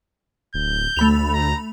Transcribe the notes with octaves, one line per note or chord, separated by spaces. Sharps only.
D1 G6
D2 A3 B5 F7
A#5